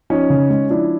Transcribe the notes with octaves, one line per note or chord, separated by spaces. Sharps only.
F3 C#4 D#4
C#3
G#3
F3 D4 E4